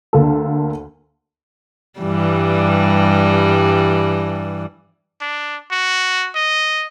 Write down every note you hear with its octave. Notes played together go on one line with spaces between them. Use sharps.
D2 D3 A#3 A4
G2 E3 G3
D4
F#4
D#5